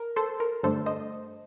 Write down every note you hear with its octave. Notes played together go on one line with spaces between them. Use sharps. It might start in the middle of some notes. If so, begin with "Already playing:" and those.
Already playing: A#4
A4 C5
A#4
G2 D3 A3 D4 A4 C5
C5 D#5